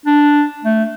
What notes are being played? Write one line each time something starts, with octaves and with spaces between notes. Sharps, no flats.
D4
A3